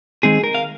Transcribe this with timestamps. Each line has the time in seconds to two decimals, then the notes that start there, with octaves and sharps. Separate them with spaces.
0.23 D#3 G#3 C4 D#4 G#4
0.44 A#4
0.55 F5